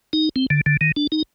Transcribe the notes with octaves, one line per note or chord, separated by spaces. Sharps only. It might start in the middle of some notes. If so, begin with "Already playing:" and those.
D#4
C4
D3
D3
D#3
D4
D#4